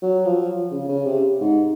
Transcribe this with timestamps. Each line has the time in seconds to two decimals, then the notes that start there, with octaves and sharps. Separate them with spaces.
0.02 F#3
0.26 F3
0.71 C#3
0.89 C#3
1.06 C3
1.41 G#2